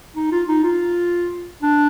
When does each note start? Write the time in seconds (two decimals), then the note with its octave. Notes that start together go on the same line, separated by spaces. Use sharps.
0.16 D#4
0.32 F4
0.48 D#4
0.64 F4
1.62 D4